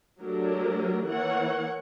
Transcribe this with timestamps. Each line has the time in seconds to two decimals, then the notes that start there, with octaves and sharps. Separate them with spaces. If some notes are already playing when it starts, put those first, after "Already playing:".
0.21 F#3 A3 D4 G4 A#4
1.08 E3 A#3 A#4 C#5 F#5